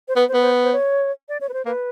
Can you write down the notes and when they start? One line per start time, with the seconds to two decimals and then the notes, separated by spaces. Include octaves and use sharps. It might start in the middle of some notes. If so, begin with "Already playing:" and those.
0.08 C5
0.16 B3 B4
0.29 C5
0.34 B3 B4
0.41 C5
0.63 C5
0.72 C#5
1.29 D5
1.41 C#5
1.49 B4
1.54 C5
1.66 A#3 B4